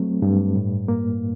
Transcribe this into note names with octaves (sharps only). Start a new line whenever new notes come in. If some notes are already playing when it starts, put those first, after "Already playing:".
Already playing: F#3 A3 C4
G2
A2
A#3